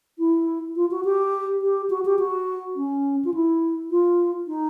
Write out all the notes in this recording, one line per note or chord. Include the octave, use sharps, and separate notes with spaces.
E4
F4
F#4
G4
G4
F#4
G4
F#4
C#4
F4
E4
F4
D#4